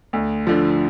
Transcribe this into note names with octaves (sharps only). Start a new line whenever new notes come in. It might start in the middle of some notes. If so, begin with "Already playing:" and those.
D2
D3 F3